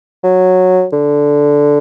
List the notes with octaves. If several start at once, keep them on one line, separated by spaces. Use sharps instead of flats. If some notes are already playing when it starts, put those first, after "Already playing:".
F#3
D3